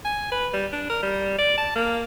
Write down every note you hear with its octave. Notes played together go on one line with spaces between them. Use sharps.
G#5
B4
G3
D4
A#4
G3
D5
A5
A#3